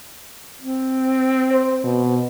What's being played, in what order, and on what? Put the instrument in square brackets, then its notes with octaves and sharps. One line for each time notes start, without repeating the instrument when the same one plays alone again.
[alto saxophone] C4
[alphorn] C5
B2